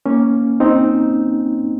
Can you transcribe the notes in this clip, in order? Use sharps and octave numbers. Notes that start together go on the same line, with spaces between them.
A#3 C#4
C4 D#4